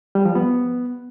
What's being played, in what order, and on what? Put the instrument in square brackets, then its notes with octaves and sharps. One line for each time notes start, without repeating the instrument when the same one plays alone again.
[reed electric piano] G3
F3
B3